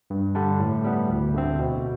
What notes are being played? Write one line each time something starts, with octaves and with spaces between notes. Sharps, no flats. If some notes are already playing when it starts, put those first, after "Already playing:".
G2
D3 G3 D4
A2
G3 B3
D2
D3 A3 C4
B2